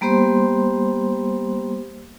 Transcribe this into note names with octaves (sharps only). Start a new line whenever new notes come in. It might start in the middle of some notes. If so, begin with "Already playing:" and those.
G3 A#3 B3 G4 C5 C6